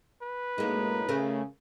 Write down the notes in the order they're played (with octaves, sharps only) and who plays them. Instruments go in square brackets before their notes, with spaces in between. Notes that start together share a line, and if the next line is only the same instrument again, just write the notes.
[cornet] B4
[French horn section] F#2 A2 D#4 [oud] G#3 A#3
[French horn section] C#3 [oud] A3 A#4